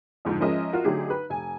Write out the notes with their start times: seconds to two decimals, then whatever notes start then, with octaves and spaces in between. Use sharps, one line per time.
0.25 F2 G#2 D3 F3
0.40 F3 G#3 C#4 A#4 D#5 E5
0.73 F4 F#4 A#4
0.84 D3 F#3 A3 D#4 G4 G#4
1.10 B4
1.30 F1 G#5